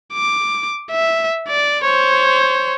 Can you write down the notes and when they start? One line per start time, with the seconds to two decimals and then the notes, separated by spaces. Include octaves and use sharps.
0.13 D6
0.91 E5
1.48 D5
1.84 C5 C#5